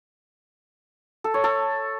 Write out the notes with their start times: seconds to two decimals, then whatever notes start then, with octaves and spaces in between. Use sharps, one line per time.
1.24 A4
1.34 C#5
1.44 A4